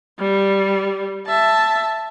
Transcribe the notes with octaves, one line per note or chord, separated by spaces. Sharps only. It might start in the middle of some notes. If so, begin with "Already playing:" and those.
G3
E5 A5